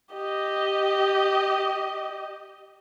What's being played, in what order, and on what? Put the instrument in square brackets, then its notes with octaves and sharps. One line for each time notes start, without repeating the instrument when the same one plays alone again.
[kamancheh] G4 D#5